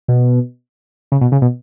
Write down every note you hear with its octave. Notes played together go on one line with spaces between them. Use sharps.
B2
C#3
B2
C#3
B2